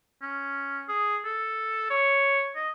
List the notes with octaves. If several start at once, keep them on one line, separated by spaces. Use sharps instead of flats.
C#4
G#4
A4
C#5
D#5